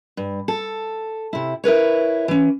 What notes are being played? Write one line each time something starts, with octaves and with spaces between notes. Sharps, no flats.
G2
A4
C3 E4
E4 A#4 B4 C#5
E3 C#4